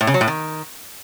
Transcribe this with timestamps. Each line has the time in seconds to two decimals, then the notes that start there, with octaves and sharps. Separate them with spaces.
0.01 A2
0.07 C#3
0.14 F#3
0.21 A2
0.28 D#3